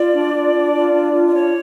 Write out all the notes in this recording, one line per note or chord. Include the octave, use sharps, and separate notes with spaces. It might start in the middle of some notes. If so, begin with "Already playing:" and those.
Already playing: F4 D5
D4
F4
D4
F4
D4
F4
D5
D4 C#5